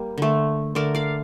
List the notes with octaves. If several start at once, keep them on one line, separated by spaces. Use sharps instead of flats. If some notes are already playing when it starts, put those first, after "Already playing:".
Already playing: G3 A#3
D3 A3
D3 A3 A#4 D5
D5 F5